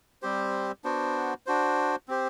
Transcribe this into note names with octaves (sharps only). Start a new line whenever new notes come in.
G3 C4 G4 C5
B3 D4 F#4 C5
D4 F#4 C5
C4 G4 C5